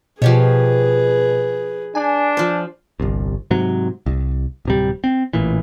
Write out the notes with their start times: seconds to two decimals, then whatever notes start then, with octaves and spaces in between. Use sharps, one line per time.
0.22 B2 F3 G4 G#4 B4 C#5
1.95 D4 G#5
2.37 F3 C5
3.00 G1 C2
3.51 G#2 C3 F#3
4.06 C2
4.65 D1 C3 G3
5.04 C4
5.33 A1 A#2 E3